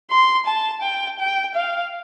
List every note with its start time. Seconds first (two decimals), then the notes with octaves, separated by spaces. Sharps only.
0.11 C6
0.46 A5
0.82 G5
1.19 G5
1.55 F5